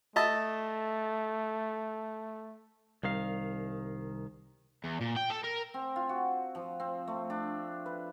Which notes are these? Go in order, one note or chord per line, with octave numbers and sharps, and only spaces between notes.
A3 D#5 E5 A5
C2 D#3 G3 F5
E2
A#2
G5
A4
A#4
C4
F4
F#4
F3
C4
A3
D4
B4